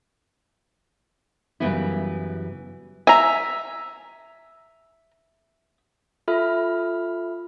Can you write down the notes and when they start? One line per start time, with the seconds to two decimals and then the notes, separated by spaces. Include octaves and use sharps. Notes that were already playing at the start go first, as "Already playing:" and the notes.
1.60 F#2 C#3 E3 G3 B3 E4
3.07 E5 G#5 A#5
6.28 F4 A4 E5 B5 F6